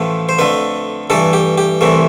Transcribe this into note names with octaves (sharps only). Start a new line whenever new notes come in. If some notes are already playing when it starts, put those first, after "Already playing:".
Already playing: A1 A2 F3 A3 B4
C5
F2 D3 A3 B4
G2 E3 A3 A4
G4
G4
C2 C3 E3 A3